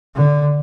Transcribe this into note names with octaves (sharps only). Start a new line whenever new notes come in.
D3